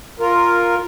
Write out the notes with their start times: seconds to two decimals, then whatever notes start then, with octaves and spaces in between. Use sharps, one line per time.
0.20 F4 A#4